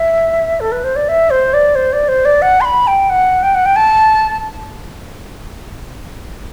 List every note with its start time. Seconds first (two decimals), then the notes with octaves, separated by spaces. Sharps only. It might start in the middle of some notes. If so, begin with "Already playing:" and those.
Already playing: E5
0.60 A4
0.72 B4
0.84 C5
0.96 D5
1.09 E5
1.30 C5
1.54 D5
1.75 C5
1.93 D5
2.08 C5
2.25 D5
2.42 F#5
2.61 C6
2.65 B5
2.87 G5
3.10 F#5
3.43 G5
3.55 F#5
3.66 G5
3.76 A5